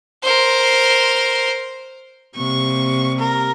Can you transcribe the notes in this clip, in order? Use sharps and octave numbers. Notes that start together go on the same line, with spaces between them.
A#4 C5
C3 G3 A#3 C#6
A#4